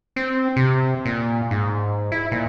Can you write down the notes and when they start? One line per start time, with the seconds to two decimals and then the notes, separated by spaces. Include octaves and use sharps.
0.16 C4
0.56 C3
1.06 A#2
1.51 G#2
2.12 E4
2.32 A#2